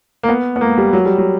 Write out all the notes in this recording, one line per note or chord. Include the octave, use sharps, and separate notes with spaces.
A#3
B3
B3
A#3
G3
F#3
G3
F#3